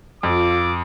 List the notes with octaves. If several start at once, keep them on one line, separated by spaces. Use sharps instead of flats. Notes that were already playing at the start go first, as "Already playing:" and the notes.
F2 F4 D6